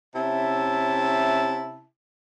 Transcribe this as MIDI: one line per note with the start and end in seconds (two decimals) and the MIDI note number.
0.15 1.84 48
0.15 1.84 61
0.15 1.84 64
0.15 1.84 76
0.15 1.84 81